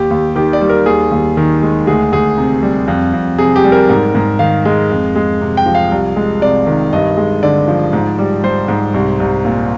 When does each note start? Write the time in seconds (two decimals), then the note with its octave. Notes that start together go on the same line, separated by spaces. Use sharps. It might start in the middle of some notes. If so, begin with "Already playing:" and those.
Already playing: D#2 G4
0.10 D#2
0.35 D#3 G4
0.53 D5
0.61 G3
0.69 A#4
0.86 D#2 G#4
1.11 D#2
1.37 D#3
1.62 G#3
1.87 D2 G#4
2.12 D2 G#4
2.38 C3
2.63 G3
2.88 F2
3.13 F2
3.39 C3 G#4
3.56 G4
3.64 G3
3.72 A#4
3.90 G#2
4.15 G#2
4.39 D#3 F5
4.65 G#3
4.90 F2
5.16 G#3
5.41 C3
5.57 G5
5.66 F3
5.75 F5
5.91 C2
6.16 G#3
6.41 C3 D5
6.67 D#3
6.93 G2 D#5
7.17 G#3
7.43 D3 D5
7.68 F3
7.93 G#2
8.19 G3
8.44 G3 C5
8.68 G#2
8.94 C2
9.20 C2
9.45 A#2